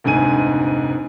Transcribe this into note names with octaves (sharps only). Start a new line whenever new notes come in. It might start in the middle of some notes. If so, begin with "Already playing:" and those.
F1 D2 G#2 G#5 D#7